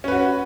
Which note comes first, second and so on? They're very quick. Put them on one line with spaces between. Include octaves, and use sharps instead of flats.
C#4 B4 F#4